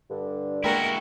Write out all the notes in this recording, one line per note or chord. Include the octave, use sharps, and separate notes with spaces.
G2 D3
G#3 A#3 E4 F#4 A#4 G5